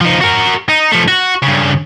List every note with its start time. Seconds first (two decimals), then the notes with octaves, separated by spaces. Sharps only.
0.01 F3 D#4
0.21 F#4 A#4
0.69 D#4
0.92 F3 A3
1.08 F#4
1.43 G2 C#3